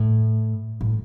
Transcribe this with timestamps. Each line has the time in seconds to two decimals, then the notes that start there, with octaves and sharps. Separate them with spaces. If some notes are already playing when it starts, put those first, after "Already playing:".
Already playing: A2
0.81 A2